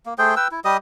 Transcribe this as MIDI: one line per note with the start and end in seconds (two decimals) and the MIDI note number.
0.06 0.14 58
0.18 0.35 57
0.18 0.35 68
0.18 0.35 72
0.18 0.35 79
0.36 0.48 71
0.36 0.48 79
0.36 0.48 88
0.51 0.60 64
0.65 0.77 55
0.65 0.77 67
0.65 0.77 75
0.65 0.77 87